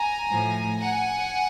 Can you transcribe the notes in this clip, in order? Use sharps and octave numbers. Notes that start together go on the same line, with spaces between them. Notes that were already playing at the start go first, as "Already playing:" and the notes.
Already playing: G#5 A#5
A2 F3
F#5 G#5